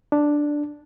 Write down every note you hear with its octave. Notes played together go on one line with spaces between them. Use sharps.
D4